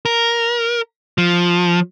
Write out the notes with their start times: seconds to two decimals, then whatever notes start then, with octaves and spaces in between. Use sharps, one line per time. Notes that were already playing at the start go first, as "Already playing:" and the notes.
0.05 A#4
1.18 F3